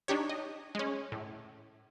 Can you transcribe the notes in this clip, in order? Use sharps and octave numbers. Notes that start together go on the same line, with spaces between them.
D4 D#4 G4 C#5
D#5
G#3 C#4
A2